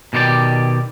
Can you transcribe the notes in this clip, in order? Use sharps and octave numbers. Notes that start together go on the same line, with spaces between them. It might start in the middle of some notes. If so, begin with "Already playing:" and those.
B2 D#3 G4 C5 D5